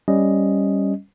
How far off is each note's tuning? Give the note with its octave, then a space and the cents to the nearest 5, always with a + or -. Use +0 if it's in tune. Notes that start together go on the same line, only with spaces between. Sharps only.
G3 +0 C#4 +0 D#5 +0